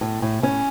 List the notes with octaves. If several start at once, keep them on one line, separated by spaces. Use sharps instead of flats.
A2
A2
A2 C#4